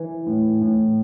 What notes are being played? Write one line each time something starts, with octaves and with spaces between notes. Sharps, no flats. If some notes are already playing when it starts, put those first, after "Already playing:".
Already playing: E3
A2
A2